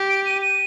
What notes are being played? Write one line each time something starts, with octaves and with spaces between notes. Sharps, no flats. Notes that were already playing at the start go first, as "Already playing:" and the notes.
Already playing: G4
D7
D#7
D#7